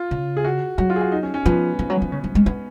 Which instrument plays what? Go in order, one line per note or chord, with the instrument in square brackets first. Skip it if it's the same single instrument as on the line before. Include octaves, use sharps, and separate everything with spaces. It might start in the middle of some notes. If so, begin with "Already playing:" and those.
Already playing: [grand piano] F4
[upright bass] C#3
[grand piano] G#4
F#4
[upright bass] F#3 [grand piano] F#4
[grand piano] F4
G#4
F#4
D#4
C#4
C#4
[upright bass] F3 [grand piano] B3
[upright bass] F3
F#3
F3
C#3
F3
G#3
B3